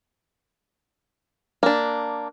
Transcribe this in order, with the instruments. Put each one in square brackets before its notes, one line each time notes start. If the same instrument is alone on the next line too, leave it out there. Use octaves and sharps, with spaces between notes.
[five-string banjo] A#3 D4